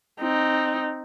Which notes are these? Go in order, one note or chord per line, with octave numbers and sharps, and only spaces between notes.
C4 D#4